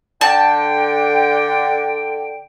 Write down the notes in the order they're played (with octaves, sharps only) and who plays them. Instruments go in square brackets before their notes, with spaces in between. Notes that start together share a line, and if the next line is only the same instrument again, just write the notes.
[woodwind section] D3 G5 [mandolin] A5